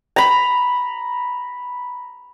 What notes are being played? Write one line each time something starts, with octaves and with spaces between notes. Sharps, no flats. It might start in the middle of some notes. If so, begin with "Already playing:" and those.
A#5 B5